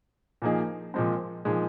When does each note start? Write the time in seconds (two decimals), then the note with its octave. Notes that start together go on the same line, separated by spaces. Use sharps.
0.42 A#2 F3 A#3 D#4 G#4
0.94 A#2 F3 G#3 C4
1.45 A#2 F3 G#3 D#4 G#4